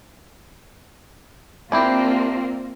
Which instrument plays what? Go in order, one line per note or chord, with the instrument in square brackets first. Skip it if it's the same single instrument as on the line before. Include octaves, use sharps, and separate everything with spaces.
[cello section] A#3 C4 F4 [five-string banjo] D4 E4 G4